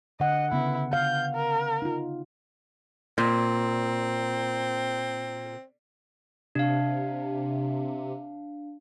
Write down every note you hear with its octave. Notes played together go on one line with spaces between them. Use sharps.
D3 D#5 F#5
C#3 B3 E4
F5 G6
A#4
D#4 F4
A#2 C4
C3 D4 F5